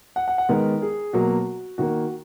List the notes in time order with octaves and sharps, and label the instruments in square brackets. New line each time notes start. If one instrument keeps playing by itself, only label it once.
[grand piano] F#5
F#5
F#5
D#3 G#3 B3 A#4
G#4
B2 F#3 A#3 F#4
D#3 A#3 F#4